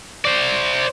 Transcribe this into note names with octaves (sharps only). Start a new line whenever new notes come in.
C5 D5